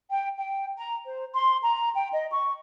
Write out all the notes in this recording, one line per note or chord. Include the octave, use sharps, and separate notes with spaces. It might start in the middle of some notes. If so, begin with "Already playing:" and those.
G5
G5
A#5
C5
C6
A#5
G5
D#5
C#6